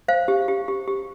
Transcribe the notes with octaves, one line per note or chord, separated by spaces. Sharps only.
C5 F5
G4
G4
G4
G4